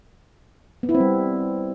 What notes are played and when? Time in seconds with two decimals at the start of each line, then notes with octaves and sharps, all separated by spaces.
0.83 B3
0.89 E4
0.95 C4
1.00 G3